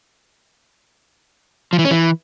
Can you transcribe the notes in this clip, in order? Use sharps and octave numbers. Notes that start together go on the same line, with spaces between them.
F3
E3
C#4
E3